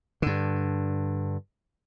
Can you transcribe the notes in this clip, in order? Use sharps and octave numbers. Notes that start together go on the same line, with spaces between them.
G2 D3